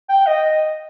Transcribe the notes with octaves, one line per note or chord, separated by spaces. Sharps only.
G5
D#5